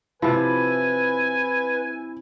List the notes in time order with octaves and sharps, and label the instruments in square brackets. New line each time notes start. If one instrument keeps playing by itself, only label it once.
[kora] C3 F3 [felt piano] E4 [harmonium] B4 [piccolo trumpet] G#5